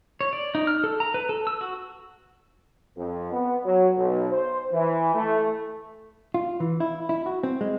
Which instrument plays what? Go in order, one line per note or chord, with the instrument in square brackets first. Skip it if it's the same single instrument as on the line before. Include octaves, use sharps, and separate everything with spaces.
[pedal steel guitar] C#5
D5
D#4
F6
A4
A#5
B4
A4
E6
F#4
[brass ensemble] F2
B3
F#3
B1
C5
E3
A3
[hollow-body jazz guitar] F4
E3
E4
E4
F#4
C4
G#3